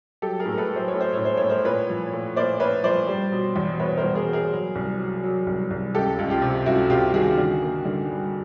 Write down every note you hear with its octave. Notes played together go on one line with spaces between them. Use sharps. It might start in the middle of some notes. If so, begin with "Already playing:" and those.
F#3 G4 A4
G#4 A#4
A2
A#4
A4 B4
F#3
C5
C#5
A2
C5
A2 C#5
C5
A2 C#5
A#4 C5
A#2 B4 C#5
F3
A#2
A#3 C5 D5
A#3 B4 C#5
F3 C5 D5
G3
B2
E2
B2 B4 C#5
A#4 C5
E2
G#4 A#4
A#3
G#4 A#4
F#3
C2
F#3
F#3
C2
C2
C#2 G4 A4
C#2
F4 G4
C3
C#2 E4 F#4
C3 F4 G4
D#3 F#4 G#4
D3
A#3
D3
G2